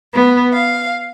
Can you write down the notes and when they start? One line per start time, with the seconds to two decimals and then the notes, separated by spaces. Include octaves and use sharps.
0.14 B3
0.53 F5